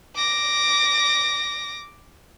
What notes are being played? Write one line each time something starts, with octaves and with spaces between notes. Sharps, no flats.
D6 A#6